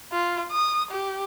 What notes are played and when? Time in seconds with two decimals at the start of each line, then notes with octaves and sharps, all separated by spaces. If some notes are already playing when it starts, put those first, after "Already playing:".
0.12 F4
0.52 D#6
0.91 G4